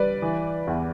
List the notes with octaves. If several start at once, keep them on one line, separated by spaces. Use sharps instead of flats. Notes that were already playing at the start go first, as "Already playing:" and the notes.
Already playing: G3 B4 D5
E3
E2